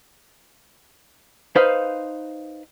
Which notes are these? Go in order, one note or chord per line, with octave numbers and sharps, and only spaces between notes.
D#4 B4 C5 F5